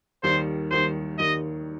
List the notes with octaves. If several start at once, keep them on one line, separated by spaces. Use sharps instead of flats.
D#2 D#3 G3 C5
D#2 D#3 G3 C5
D#2 D#3 G3 D#5